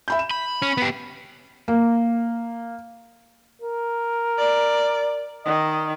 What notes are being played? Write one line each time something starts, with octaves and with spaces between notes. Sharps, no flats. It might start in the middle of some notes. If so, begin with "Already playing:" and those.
E5 B5 G6
E7
B5
C#4
B3 G4
A#3
A#4
D5
D#3 D#5